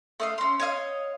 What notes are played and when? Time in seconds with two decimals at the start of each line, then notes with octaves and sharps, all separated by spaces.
0.20 A3 D#5 F5
0.38 C#4 C6
0.60 C#5 D#5 F5